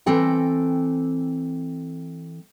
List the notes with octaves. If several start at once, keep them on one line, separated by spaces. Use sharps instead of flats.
E3 C4 A4 G5 A#5